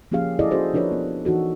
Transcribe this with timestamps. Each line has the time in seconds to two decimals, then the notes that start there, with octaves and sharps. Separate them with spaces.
0.12 F3 A#3 C#4 G4 G#4 F5
0.39 E4 G#4 A4 D5 D#5
0.51 C#4 F#4 G#4 A4 C5
0.74 F3 D4 F4 A#4 B4 C#5
0.92 B3
1.25 E3 D#4 F#4 A4